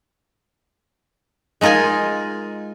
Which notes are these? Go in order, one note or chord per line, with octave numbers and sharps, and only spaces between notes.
G#3 D#4 F4 A#4 G#5